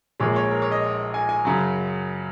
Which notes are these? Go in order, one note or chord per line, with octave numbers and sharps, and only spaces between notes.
A#1 A#2 G#3 C#5
C#5
A#4
C#5
D#5
G#5
G#5
F#2 C#3 F#3